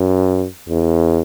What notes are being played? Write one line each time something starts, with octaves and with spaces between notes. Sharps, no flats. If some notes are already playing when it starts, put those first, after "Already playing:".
Already playing: F#2
E2